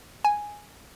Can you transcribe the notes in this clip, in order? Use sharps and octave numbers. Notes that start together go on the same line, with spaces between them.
G#5